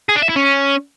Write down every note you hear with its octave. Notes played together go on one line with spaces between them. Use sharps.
G#4
D4
E5
E4
C#4